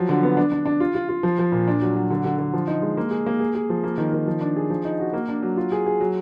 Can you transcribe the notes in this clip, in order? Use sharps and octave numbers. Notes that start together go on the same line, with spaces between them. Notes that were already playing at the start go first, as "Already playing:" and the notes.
Already playing: F3 F#3
D3
B3
D4
D4
D4
F4
F4
F4
F3
F3
A#2
D4
F#3
F#3
D3
D3
D3
F3
D#4
G#3
A#3
G#4
A#3
G#4
G#4
F3
A#3
D#3
D#3
F3
D4
G#4
F3
D#4
F#4
A#3
D4
F#3
F4
G#4
G#4
F#3